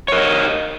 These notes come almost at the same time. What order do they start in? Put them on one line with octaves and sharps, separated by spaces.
C#5 A#4 D#5